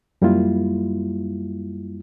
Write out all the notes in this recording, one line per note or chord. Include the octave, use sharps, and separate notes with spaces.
F#2 G3 A#3 E4 F4